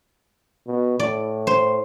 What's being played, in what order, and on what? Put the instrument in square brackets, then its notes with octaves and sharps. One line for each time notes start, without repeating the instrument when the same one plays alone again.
[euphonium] B2
[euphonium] A2 [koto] D5
[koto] C5